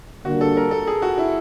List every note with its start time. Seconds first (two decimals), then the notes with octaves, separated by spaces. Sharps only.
0.25 D3 G3 A#3 D4 F#4
0.41 A4
0.57 A#4
0.71 A4
0.87 G#4
1.02 F#4
1.18 E4